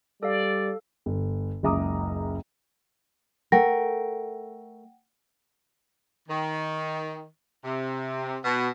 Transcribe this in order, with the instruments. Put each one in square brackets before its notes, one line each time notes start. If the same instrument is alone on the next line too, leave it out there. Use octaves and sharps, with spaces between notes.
[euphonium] G3 [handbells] A4 F5 [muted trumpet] D5
[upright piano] G1
F#1 C#2 E5 A#5 D6 D#6
[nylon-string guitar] A3 A#4 [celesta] F#5 G5 A#6
[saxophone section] D#3
C3
B2